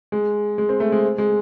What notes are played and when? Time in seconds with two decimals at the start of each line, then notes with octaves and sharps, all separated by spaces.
0.12 G#3
0.58 G#3
0.69 C4
0.80 A3
0.92 G#3
1.18 G#3